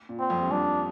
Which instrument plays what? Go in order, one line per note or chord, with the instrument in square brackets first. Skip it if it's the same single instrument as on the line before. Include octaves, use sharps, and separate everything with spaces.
[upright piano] A#2
[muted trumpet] C4
[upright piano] F2
G2
[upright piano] F2 [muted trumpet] D4